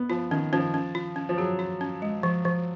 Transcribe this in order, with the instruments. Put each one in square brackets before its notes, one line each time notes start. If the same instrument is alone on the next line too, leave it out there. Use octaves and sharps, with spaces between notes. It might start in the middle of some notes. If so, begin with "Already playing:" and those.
Already playing: [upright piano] B3
[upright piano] F3 [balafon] F4
[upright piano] D#3 [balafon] C#4
[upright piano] F3 [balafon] C#4
[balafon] C#4
F4
C#4
[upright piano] F3
[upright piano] F#3 [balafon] G#4
[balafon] F4
C#4
G#3
F3
F3